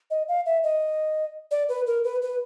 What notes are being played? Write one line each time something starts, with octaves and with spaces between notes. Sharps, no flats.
D#5
F5
E5
D#5
D5
B4
A#4
B4
B4